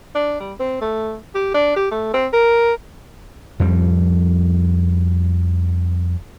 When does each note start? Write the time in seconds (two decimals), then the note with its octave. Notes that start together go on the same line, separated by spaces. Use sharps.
0.15 D4
0.40 G3
0.59 C4
0.81 A3
1.35 G4
1.54 D4
1.76 G4
1.91 A3
2.14 C4
2.33 A#4
3.60 F2 F3 G3